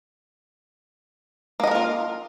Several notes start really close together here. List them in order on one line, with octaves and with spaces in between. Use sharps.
A#3 D#5 B3 A#4 F4